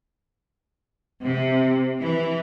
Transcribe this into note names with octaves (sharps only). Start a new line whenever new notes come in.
C3
E3